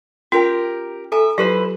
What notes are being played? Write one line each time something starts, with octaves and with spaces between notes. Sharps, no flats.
C#4 F4 G4 A#4 G5
A4 E5 G#5 A#5
F#3 E4 F4 G4 B4 C5